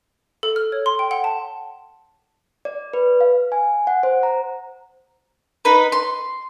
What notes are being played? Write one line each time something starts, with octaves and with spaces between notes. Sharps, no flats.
A4
F6
C#5
C6
G5
F#5
A5
D5
B4
F5
G#5
F#5
C5
A#5
D#4 B4
C6